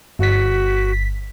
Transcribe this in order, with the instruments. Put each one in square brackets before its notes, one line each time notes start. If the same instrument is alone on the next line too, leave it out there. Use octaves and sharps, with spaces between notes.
[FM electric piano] G1 B6 [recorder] F#4